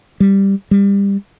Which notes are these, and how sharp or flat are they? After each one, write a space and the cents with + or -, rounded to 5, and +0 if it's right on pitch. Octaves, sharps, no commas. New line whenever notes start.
G3 +5
G3 +25